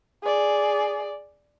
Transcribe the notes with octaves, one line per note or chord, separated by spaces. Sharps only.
G#4 D5